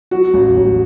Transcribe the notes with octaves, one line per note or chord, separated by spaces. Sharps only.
F#3 F#4
A1
A1